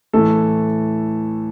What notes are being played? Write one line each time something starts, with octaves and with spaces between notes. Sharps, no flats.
A2 E3 A3 A4